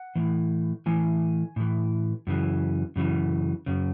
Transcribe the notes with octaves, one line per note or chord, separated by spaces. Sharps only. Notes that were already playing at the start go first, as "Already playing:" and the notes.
Already playing: F#5
A2 E3
A2 E3 G#5
A2 E3
F#2 C#3 E3
F#2 C#3 E3
F#2 C#3